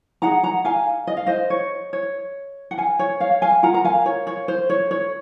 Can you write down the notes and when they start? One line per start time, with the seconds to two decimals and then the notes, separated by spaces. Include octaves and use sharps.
0.22 D#4 G#4 F#5 A#5
0.43 F#5 A#5
0.65 F5 G#5
1.07 D#5
1.17 F5
1.26 C5 D#5
1.50 C#5
1.93 C#5
2.71 F#5
2.78 F5 G#5
2.99 C#5
3.20 C#5 F5
3.42 F5 G#5
3.63 F4 A#4 F#5 A#5
3.74 A#5
3.85 F5 G#5
4.06 C#5
4.27 C#5
4.48 C5
4.70 C#5
4.91 C#5